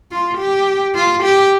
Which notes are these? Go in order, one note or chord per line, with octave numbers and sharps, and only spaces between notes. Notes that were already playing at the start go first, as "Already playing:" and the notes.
F4
G4
F4
G4